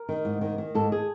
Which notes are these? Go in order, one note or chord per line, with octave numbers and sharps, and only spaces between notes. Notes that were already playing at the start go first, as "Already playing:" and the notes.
Already playing: A#4
D#3
G#2
D#3
D#3
G#2 A4
G#4